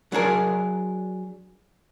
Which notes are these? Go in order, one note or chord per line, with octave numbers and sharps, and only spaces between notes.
F#3 D4 G#4 A#4